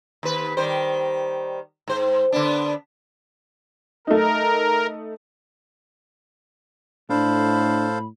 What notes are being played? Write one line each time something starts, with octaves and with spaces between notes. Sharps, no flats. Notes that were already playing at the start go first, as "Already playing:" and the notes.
D#2 B4
D#3 G3 C5
G#2 C5
D3 B3 D4
A3 D#4 A#4
A2 D4 A4 C5 F5 B5